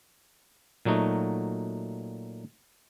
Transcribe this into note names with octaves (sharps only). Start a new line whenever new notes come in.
A#2 F#3 A3 D#4 F#4